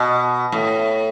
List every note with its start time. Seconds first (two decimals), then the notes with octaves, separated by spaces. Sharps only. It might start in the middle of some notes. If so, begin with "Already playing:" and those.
Already playing: B2
0.52 A2